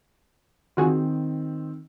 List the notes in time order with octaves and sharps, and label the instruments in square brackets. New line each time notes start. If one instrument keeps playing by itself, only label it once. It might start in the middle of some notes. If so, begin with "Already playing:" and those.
[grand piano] D#3 C4 [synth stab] F4 F#4 G#4